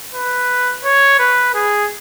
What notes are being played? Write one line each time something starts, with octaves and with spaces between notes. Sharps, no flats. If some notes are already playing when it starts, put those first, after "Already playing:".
B4
C#5
B4
G#4